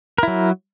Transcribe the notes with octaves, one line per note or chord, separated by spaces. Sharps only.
F#3 E4 A#4